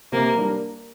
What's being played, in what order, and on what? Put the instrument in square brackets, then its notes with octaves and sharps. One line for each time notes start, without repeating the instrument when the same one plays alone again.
[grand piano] C3 [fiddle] A#3
[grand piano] G3 D4 A#4